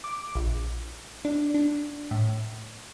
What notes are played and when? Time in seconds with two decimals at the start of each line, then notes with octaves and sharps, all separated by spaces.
0.04 D6
0.35 A#1
1.25 D4
1.54 D4
2.11 A2